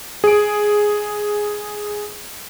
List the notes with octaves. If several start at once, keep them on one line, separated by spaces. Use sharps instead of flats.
G#4 D7